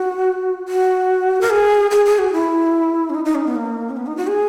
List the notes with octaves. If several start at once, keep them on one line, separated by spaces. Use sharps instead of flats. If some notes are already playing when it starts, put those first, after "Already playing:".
Already playing: F#4
F#4
A#4
G#4
G#4
G#4
F#4
E4
C#4
D#4
D#4
C#4
B3
A#3
C#4
B3
D#4
F#4
G#4